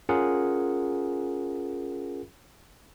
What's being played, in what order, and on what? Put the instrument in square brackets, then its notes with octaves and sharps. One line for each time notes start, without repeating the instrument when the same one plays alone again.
[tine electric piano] C#4 F4 G#4 A#4 F#5